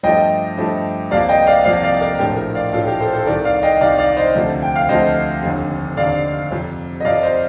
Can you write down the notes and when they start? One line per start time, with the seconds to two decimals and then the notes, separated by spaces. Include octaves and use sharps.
0.03 G2 F3 A3 D#5 G5
0.57 G2 F3 A3
1.11 C2 C3 F3 A#3 D5 F5
1.29 D#5 G5
1.47 D5 F5
1.65 C2 C3 F3 A#3 D5 F5
1.83 D5 F5
2.01 A#4 D5
2.19 A#1 A2 F3 A3 G4 A#4
2.37 G4 A#4
2.55 D5 F5
2.73 A#1 A2 F3 A3 F4 A4
2.87 G4 A#4
3.01 A4 C5
3.13 A4 C5
3.26 C2 C3 D#3 A#4 D5
3.45 D5 F5
3.63 D#5 G5
3.81 C2 C3 D#3 D5 F5
3.98 D5 F5
4.17 C5 D#5
4.35 D2 C3 F3 A3
4.62 G5
4.76 F5
4.89 D2 C3 F3 A3 C5 D#5
5.42 F1 D#2 D3
5.97 F1 D#2 D3 D5 F5
6.51 F2 C3 F3
7.00 D#5
7.05 F2 C3 F3 D5 F5
7.23 C5 D#5